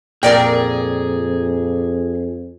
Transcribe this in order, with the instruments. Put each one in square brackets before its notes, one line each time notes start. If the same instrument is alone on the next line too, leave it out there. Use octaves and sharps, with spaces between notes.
[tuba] F2 [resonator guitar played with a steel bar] A#2 [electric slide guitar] G#4 [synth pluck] A#4 D5 G5